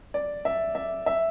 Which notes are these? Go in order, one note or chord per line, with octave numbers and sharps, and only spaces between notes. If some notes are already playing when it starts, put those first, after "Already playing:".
D5
E5
E5
E5